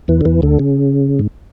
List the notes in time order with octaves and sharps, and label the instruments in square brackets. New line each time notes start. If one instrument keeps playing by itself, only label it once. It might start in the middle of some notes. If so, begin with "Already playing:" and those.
[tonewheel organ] E2 E3
D3
E2 E3
D2 D3
C#3
G#2